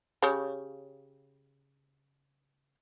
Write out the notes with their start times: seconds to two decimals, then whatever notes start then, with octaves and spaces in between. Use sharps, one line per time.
0.22 C#3 G4 C#5